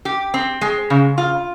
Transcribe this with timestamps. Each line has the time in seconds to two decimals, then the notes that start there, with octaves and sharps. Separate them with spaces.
0.05 G4
0.34 C4
0.61 G#3
0.90 C#3
1.18 F4